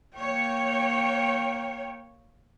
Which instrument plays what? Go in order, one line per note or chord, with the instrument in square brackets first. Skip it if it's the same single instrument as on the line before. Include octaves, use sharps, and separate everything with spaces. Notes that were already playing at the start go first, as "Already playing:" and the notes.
[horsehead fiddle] A#3 G5 [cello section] C#5